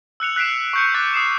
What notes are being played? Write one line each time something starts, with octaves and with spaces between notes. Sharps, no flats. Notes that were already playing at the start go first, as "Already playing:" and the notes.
E6 F#6 C#7 F7
F#6 B6 C7 D7 E7
C#6 G6 C#7
D6 F#6 G6 A6
D#6 C7 E7